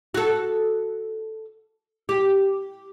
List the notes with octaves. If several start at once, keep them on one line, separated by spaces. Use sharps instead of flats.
F#4 A4
G4